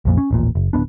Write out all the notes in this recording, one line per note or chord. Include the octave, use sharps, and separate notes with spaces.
B1 F2 A#2
C#4
D#1 A1 A#2
F#1
D1 D#2 B3 D4